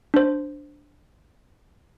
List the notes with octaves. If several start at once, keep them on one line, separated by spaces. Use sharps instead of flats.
D4 C5